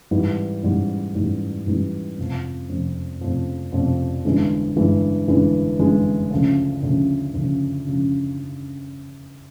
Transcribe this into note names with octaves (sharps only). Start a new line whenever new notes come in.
G#2 E3 G3
G#2 E3 G3
G#2 E3 G3
G#2 E3 G3
F2 C3 F3
F2 C3 F3
F2 C3 F3
F2 C3 F3
G1 G2 E3 G#3
G1 G2 E3 G#3
G1 G2 E3 G#3
G1 G2 E3 G#3
D2 C#3 F3
D2 C#3 F3
D2 C#3 F3
C#3 F3